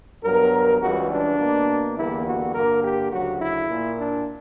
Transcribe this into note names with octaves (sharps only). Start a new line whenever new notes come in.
G2 F#3 B3 A#4
C#2 C#3 E3 G3 F#4
D4
B2 A#3
E2 D3 G3 A#3 E4
F#4
G2 D3 A#3 A#4
G4
D2 C#3 F#3 F#4
E4
A#2 A#3
D4